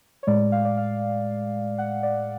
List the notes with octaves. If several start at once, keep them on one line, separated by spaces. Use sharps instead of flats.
C#5
A2 G#3 D5
F5
D5
F5
F#5
D5